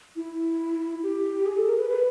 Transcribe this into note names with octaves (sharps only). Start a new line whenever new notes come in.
E4
G4
G#4
A4
A#4
B4
B4